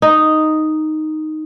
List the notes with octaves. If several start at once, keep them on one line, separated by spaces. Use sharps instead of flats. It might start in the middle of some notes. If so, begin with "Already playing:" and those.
D#4